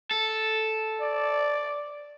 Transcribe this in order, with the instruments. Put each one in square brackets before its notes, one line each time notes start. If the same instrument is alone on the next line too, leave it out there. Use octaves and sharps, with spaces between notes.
[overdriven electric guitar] A4
[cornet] D5